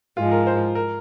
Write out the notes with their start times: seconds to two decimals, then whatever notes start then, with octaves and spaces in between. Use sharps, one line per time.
0.17 G#2 F3 G#3 F4
0.31 A#4
0.47 C5
0.75 A#4